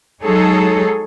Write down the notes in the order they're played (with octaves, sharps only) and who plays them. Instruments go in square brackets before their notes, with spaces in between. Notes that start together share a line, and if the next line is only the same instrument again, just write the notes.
[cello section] F#3 G#3 D#4 G#4 A4 C#5